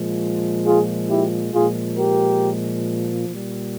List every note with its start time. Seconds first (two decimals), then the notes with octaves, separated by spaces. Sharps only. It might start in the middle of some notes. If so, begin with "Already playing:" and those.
Already playing: A#2 F3 G#3
0.66 F4 G#4
1.10 E4 G4
1.54 A#2 F3 G#3 F4 G#4
1.97 G4 A#4
3.29 A#2 G3